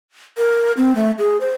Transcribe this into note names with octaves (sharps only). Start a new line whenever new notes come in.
A#4
C4
A3
G#4
C5